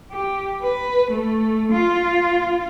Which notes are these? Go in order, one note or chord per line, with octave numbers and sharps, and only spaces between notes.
G4
B4
A3
F4